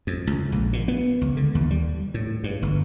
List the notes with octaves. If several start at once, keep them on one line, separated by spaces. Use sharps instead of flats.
F2
C#2
A#1
A#2
B3
C#2
D3
D#2
G3
A2
G2
G1